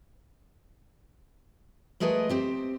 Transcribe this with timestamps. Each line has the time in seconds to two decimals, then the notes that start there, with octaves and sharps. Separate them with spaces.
2.00 G#3 A3 G#4 A#4 B4 D#5
2.29 C4 G4 C5